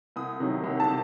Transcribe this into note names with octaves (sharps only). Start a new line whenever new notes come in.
C2 D#6
C3 D#3 F#3
C2
A5
C3